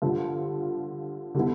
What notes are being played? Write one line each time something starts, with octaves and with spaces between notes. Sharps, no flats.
G2 D3 F3
D3 G3 B3 E4